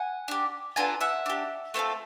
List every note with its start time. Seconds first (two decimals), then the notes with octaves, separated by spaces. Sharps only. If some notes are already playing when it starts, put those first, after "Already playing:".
Already playing: F#5 G#5
0.28 D4 G4
0.76 B3 D4 F4 A4 G#5 A#5
1.01 E5 F#5
1.26 D4 G4
1.74 A3 C4 F4 A4